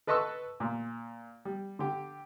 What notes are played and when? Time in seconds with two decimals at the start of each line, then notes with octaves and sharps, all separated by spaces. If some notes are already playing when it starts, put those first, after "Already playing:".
0.07 A4 B4 D#5 A5 C#6 E6
0.60 A#2
1.45 G3
1.79 D3 G4